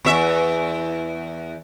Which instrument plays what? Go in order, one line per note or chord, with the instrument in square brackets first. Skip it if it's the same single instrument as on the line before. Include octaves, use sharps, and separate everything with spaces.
[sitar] E2 E5